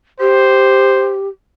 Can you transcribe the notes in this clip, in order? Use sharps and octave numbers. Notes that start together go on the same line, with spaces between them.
G4 C5